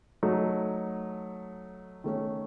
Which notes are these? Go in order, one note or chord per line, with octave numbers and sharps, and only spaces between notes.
F#3 A3 D#4
D#3 A3 C#4